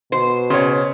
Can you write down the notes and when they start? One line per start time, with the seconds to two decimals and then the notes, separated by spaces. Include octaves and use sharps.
0.12 B2 C5
0.50 C#3 C#5 C6